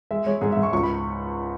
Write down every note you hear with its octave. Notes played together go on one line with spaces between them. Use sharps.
G#3 E5
G#3 C#5
G#2 G#4
E5
G#2
C#6
C#2 C#6
B5